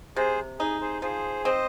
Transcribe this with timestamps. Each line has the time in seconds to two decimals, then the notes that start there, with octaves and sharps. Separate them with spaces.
0.16 C3 G#4 C5
0.59 D#4 G#4
0.81 G#4 C5
1.02 F3 G#4 C5
1.45 C4 C5 D#5